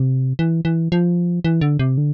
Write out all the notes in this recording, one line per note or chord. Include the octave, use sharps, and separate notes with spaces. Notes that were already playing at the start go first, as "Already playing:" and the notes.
Already playing: C3
E3
E3
F3
E3
D3
C3
D3